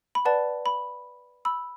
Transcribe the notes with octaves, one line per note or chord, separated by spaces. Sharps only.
B5
B4 D5 F#5 A5
B5
B5 E6